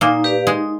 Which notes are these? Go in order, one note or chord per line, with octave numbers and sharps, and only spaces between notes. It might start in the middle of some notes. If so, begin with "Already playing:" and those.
A#2 A#3 D#4
G4 B4 D5 F5
G#3 D#4